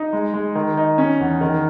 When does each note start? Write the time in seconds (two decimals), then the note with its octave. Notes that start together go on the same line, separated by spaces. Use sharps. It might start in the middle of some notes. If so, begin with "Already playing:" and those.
Already playing: D#4
0.13 G#3
0.34 G#3
0.55 D#3
0.77 D#4
0.98 C#4
1.20 E2
1.41 D#3